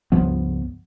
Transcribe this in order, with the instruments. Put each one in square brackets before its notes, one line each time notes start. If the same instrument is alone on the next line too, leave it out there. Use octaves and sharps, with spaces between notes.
[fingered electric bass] C#2 G2 F3 B3